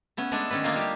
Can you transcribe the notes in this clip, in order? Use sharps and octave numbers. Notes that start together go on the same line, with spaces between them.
A3 B3 C#4
G#3 A3 D4 A4
D#3 C#4 A4 B4
A3 A#3 D4 D#4 F4
G3 G4